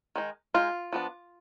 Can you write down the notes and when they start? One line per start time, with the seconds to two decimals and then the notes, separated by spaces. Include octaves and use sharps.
0.16 D#3 G#3 D#4
0.54 G#3 D#4 F4
0.93 F3 B3 D4